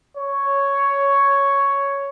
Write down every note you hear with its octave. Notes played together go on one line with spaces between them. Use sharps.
C#5